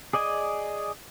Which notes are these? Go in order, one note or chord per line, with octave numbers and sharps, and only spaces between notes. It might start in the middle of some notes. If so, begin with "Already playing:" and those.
G#4 D5 D#5 G#5